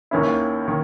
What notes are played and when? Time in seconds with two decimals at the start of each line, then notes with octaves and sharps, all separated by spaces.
0.11 D#2 D#3 A#3 C#4 E4
0.68 D#3